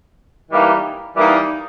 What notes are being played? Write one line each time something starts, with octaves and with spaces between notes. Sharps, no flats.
E3 G3 A#3 D#4
E3 G3 A#3 D#4